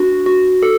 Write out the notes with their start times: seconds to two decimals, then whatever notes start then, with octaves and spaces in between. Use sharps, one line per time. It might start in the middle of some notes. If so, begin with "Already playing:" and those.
Already playing: D4 F#4
0.26 F#4
0.63 A4